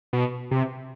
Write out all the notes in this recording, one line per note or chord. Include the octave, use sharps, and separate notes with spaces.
B2
C3